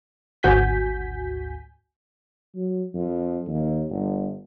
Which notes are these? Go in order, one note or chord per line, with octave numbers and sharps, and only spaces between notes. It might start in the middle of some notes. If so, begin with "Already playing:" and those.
G#1 D2 F#4 G#5 G6 B6
F#3
F2
D#2
G1